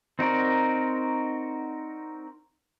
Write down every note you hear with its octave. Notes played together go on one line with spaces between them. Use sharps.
C4 D#4 F#4 A#4 D5